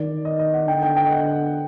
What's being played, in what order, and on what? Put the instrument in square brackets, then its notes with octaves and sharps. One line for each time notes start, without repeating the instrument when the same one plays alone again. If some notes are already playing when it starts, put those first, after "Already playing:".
Already playing: [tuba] D#3 [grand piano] D5
[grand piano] D#5
D#5
F#5
[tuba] D3 [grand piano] G5
[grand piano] G5
G5
D#5
F#5